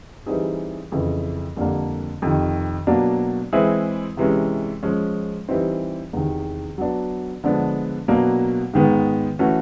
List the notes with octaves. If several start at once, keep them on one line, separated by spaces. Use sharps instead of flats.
E3 G3 C4 D#4 G#4
F2 C#3 E3
F2 D3 G3 A#3 D4
F2 C3 D#3
B2 F#3 A#3 D4
E3 G#3 C4 E4 G#4
C3 E3 G#3 C#4
F3 G#3 C#4
E3 G3 C4 D#4
E2 C3 D#3
F#3 B3 D4
D3 F3 G#3 B3 D4
B2 F#3 A#3 D4
G#2 D#3 G#3 B3
E3 A3 C#4 F#4